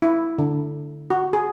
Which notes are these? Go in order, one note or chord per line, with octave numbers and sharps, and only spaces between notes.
E4
D3
F#4
G#4